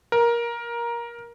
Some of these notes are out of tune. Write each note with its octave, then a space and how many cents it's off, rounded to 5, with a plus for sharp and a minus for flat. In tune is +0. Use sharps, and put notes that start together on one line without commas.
A#4 +15